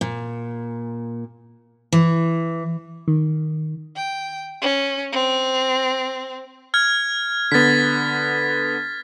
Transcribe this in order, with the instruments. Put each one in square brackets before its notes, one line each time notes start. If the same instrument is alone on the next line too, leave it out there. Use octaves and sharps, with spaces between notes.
[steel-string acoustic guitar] A#2
E3
[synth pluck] D#3
[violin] G5
C#4
C4
[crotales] F6 G#6
[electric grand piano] D3 B3 [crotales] A6 B6